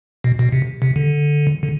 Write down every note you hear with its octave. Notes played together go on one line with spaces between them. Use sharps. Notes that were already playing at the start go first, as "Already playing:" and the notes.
B2
B2
C3
C3
D3
D3